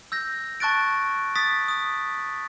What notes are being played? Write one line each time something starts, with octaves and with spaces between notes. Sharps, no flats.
E6 G6 A#6
A5 C#6 F#6 A6 D7
D#6 A6 B6
D#6